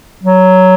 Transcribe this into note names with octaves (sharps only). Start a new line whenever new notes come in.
F#3